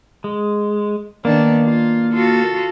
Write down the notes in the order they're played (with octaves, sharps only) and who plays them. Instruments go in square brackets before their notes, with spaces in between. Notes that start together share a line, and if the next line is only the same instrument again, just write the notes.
[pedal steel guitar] G#3
[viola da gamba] D#3 B3 D4 [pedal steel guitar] A#3
[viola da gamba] F4
F4 F#4 A4